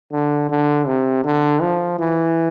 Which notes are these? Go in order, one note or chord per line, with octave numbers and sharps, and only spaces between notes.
D3
D3
C3
D3
F3
E3